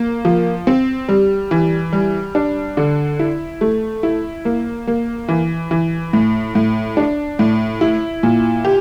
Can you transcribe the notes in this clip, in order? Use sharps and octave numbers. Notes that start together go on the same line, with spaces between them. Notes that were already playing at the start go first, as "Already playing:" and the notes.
Already playing: A#3
F3
C4
G3
E3
G3
D4
D3
E4
A3
E4
A#3
A#3
E3
E3
A2
A2
D4
A2
E4
A#2
G4